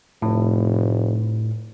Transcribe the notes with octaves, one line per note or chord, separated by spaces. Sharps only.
F1 A2